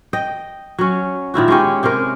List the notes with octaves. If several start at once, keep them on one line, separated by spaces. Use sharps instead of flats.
D#5 G5
F#3 C#4
A#2 D#3 E4 F#4
G#3 B3 C#4 G4
C3 G#3 C#4 A#4